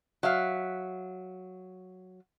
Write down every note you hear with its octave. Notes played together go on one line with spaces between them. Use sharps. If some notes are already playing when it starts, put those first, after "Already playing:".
F#3 E5 F5